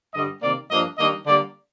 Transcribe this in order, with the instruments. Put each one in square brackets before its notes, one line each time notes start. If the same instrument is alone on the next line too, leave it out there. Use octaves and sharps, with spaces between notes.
[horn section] G2 D3 G3 D#5
C3 D#3 A#3 D5
G2 F3 A#3 D4 D#5
D#3 G3 A#3 D4 D#5
D3 G3 A#3 D5